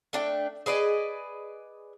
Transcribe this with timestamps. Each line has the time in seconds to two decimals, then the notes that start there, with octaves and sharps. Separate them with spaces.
0.13 A3 D4 G5
0.66 G#4 B4 D5 D#5